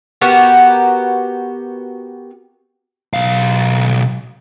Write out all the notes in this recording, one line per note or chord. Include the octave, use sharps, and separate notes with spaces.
B3 F#4 G4 A#4
B1 F5